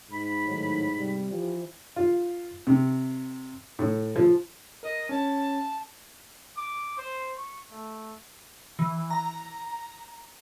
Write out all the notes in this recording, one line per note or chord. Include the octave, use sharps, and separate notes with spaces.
G#2 B5
A2 D#3 F#3
C3 G3
E3 F3 G4
F4
C3
A2
F3
A#4 D#5
C#4 A5
D6
C5
C#6
A3
E3
A#5